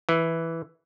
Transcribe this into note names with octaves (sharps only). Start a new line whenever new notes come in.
E3